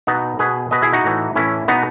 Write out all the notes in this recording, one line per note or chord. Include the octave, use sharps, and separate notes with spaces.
B2 B3 D#4
B2 G#4 B4
B2 B4 D#5
E4 G#4
D#4 F#4
A2 E3
A2 E3 C#4 E4
B2 B3 D#4